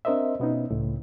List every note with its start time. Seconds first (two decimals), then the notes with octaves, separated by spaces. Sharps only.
0.05 C4 D4 A#4 C5 D#5 E5
0.40 B2 B3 C#4 D#4
0.70 C#2 A2 C#3